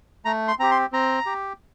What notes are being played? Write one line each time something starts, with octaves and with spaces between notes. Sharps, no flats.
A3 A#5
C6
C4 G4 A#5
C6
C4 A#5
G4